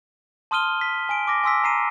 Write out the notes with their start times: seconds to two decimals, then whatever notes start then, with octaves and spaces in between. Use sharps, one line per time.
0.51 A5 C6 D#6 F6 D#7 G7
0.81 B6
1.09 G#5 D7
1.27 D6 A#6
1.44 G#5 C6 E6 B6
1.64 A#5 C7 D#7